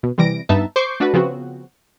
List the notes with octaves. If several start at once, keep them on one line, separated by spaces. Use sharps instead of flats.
B2
C3 E3 G3 A#6 D7
G2 B3 D#4 E5 A5
C5 C#6 D6 G6 C7
A3 D4 F#4 B4
C#3 F3 B3 C4 F#4